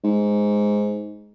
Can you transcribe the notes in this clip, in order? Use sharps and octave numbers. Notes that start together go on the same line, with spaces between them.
G#2